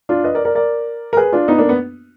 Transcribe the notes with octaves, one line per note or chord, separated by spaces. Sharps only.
D4 F4
B4 D#5
A#4 D5
A#4 D5
A#4 D5
A#4
G#4 B4
D4 F4
B3 D#4
A#3 D4
B3